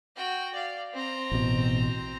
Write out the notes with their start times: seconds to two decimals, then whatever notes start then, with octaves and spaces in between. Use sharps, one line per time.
0.16 F#4 G5
0.54 D5 F5
0.94 C4 A#5
1.32 A1 B2